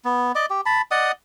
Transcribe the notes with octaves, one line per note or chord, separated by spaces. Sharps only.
B3
D5 D#5 D6
G4
A5 B5
D5 D#5 F#5 D#6